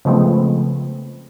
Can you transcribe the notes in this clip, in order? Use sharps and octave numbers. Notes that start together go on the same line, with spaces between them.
C#3 F3 G#3 A3 B3 C4